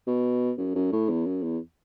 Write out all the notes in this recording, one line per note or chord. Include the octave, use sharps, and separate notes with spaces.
B2
F#2
F#2
A2
E2
F#2
E2